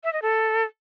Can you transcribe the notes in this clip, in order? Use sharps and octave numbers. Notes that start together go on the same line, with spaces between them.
E5
D#5
A4